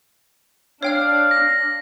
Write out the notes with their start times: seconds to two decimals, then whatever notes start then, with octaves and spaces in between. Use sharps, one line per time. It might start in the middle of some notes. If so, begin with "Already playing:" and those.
0.83 D4 C#5 F5 G5 F6
1.31 A#6